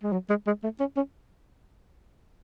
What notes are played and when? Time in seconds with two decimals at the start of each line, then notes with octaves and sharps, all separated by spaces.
0.03 G#3
0.12 F#3
0.30 G#3
0.47 G#3
0.63 A3
0.80 C#4
0.97 C#4